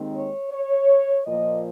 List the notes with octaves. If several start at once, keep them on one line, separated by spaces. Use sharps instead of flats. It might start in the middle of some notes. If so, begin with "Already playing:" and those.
Already playing: D#2 D#3 G#3 C4
C#5
C#5
A#2 F3 A#3 D#5